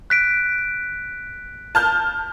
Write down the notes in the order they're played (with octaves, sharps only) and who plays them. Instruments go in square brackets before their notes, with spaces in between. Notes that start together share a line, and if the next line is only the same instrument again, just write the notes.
[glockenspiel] F#6 B6 D7
[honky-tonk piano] A5 F6 G6